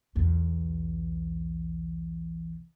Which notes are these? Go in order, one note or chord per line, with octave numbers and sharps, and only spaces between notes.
B1 E2